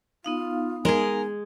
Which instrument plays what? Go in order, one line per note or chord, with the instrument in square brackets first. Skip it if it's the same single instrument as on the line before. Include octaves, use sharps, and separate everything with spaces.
[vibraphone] B3 D#4 F5 [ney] F4
[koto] G#3 G#4 [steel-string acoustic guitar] A#4 [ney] G#5